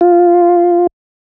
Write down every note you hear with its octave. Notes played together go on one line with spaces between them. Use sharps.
F4